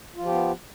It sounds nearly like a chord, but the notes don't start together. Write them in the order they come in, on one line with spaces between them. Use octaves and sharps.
F4 F3 G4 B3